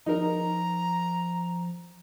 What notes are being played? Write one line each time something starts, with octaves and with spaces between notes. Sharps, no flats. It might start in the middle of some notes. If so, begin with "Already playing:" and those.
F3 D#4 A#4 A#5